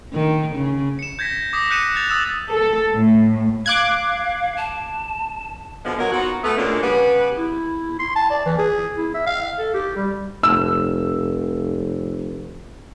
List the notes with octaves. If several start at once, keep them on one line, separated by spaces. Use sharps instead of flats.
D#3
C#3
C#7 E7
G6 G#6 A#6 B6
D6 D#6 A#6 B6
F#6 G6 B6 C#7 D#7 E7
F#6 A6 F7
D#6 E6 A6 E7
A4
A2
F5 D6 F#6 G#6
A5
B2 D3 F3 G#3 B3
F#3 A#3 F#4 A#4 C#5 D#5
B3 D#4 F4 F#4
A3 B3
D2 A#2 G#3 A#3 C#4 D4
C#3 G3 B3 B4
E4
C6
A5
D5
E3
G#4
E4
E5
F5
A4
G4
G3
F1 E6